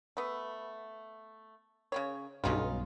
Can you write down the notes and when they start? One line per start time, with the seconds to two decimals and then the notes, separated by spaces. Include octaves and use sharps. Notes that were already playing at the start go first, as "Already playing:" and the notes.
0.17 A3 B3
1.92 C#3 B3 C#5
2.44 B1 G2 C#4 D#4 F4